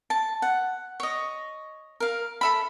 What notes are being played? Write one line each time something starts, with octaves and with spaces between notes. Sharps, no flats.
A5
F#5
C#5 D#5
A#4 F5
A4 E5 B5